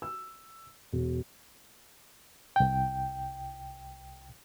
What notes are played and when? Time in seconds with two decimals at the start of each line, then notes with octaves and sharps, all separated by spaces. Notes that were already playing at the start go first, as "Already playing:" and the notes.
0.02 E6
0.92 E1
2.56 C2 G5